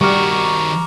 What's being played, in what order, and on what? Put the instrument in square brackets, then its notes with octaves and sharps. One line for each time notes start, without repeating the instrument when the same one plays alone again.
[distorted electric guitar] D#3 F#4 [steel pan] G3 [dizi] A#5 [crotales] C#6 D6 F6